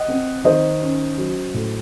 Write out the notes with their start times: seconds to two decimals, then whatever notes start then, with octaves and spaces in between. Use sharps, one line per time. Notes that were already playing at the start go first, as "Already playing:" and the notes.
Already playing: D#5 F#5
0.08 C4
0.44 D#3 C5 D#5
0.81 C#4
1.18 F#3
1.54 A2